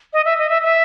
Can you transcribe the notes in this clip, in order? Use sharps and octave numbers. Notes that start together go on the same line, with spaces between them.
D#5
E5
D#5
E5
E5